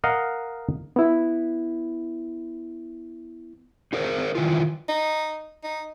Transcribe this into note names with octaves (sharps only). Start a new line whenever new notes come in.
A#4 D#5 F5 F#5
B3 E4
D#4 G#4 A#4 C5
D#3 E3 F4
D#4
D#4